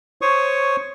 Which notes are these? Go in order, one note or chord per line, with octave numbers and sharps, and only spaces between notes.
C5 C#5 C#6 D#6